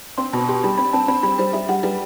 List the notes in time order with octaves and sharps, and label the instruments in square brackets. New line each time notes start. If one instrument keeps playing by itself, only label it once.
[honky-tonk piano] C4 [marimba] C6
[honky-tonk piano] B2 [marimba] B5
[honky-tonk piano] G4 [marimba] C6
[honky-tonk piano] G3 [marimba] B5
[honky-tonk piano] C4 [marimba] B5
[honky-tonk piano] C4 [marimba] A5
[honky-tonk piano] C4 [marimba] B5
[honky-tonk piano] G3 [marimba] B5
[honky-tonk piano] G3 [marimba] C5
[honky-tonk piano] G3 [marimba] E5
[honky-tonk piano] G3 [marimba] F#5
[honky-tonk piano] G3 [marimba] B4